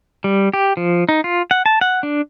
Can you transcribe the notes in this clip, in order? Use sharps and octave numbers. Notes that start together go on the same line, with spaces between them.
G3
G4
F3
D#4
F4
F#5
A5
F#5
D4